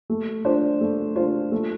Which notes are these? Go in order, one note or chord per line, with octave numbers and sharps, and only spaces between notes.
A3
D4 F4 C5
A3
D4 F4 C5
A3